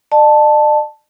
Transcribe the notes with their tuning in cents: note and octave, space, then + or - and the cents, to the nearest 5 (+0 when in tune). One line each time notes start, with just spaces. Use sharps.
D5 +45 A5 +0